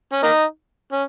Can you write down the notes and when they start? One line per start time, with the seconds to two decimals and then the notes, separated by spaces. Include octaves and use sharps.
0.13 C#4
0.23 A#3 D#4
0.92 C#4